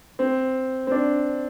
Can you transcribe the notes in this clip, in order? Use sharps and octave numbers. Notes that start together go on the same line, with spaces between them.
C4
C4
D4